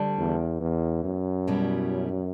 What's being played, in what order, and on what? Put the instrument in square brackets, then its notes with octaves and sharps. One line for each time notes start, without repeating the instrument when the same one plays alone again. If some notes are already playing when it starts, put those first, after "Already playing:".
Already playing: [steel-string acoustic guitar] D2 D3 G3
[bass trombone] E2
E2
F#2
[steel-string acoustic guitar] B2 G3 C#4 E4